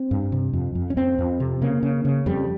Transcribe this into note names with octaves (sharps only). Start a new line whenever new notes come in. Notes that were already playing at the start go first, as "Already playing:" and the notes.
Already playing: C4
G2
C3
F2
F2
C#4
F2 C4
F2
C3
C#3 A#3
C#3
C#3
F2 G3